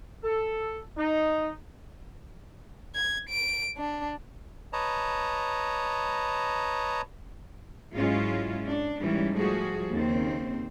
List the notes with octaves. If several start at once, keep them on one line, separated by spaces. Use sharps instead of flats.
A4
D#4
G#6
D7
D4
B4 C#5 D#5 A5 A#5
G#2 F#3 G#3 C#4 E4 F4
D4
G#2 E3 G3 C#4
F3 G3 A3 F#4 G#4
D#2 C#3 C4